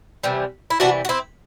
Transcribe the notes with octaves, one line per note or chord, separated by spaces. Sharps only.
C3 E3 G3
E4
C3 E3 G3 D4 F#4
F#4
C4 E4